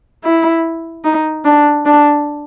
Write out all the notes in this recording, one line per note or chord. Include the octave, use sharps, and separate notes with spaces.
E4
D#4
D4
D4